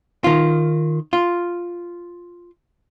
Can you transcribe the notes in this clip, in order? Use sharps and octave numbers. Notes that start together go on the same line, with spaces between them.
D#3 F4
F4